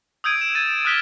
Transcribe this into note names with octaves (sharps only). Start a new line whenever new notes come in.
D#6 E6 G6 G#6 D7 D#7
E7
G#6 A6 D#7 E7
D#6 F6 F#6 B6 D#7 G7